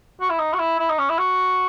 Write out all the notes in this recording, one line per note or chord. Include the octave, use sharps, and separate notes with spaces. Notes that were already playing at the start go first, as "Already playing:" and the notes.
F#4
E4
D#4
F#4
E4
E4
D#4
C#4
E4
F#4